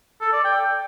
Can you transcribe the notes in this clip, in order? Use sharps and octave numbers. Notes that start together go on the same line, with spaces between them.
A4
D5
G5